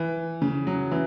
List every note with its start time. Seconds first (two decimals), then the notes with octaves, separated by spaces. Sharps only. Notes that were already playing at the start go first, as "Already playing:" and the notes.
Already playing: E3
0.42 C#3
0.67 F#3
0.91 E3